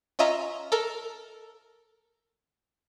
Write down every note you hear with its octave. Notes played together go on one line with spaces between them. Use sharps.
C#4 F4 D#5 E5 A#5
A4 A#4